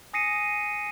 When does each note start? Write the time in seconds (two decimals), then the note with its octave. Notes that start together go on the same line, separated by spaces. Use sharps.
0.13 G#5 D#6 A#6 C7 C#7 D#7